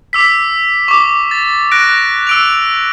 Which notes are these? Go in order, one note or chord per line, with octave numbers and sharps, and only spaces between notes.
D6 E6 B6
C#6 D6
A6
F#6 A#6 D7
E6 D7 F7